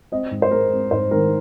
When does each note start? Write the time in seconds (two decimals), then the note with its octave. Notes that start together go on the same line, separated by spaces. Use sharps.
0.12 C4 D#5
0.31 G#2
0.42 C5
0.51 G#3 A#4
0.72 C4
0.91 G#2 C5
1.11 D#3 A#4